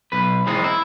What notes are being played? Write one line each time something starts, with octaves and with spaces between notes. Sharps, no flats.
B1 B4
E3 G#3 C4 D#4
E4